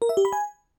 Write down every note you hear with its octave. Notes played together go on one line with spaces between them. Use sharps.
A#4
E5
G4
B5
G#5